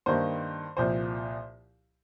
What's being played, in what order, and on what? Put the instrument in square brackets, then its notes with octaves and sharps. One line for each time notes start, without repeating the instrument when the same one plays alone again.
[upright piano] G2 D#3 A#3 C5
C2 A#2 F3 C5